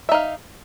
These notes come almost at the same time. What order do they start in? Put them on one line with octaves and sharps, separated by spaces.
E5 D#4 F5